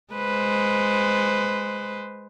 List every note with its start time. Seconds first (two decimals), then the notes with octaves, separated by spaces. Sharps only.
0.14 G#3 B4 C5